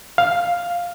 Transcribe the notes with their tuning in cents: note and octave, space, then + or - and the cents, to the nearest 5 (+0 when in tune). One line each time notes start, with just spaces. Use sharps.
F5 +5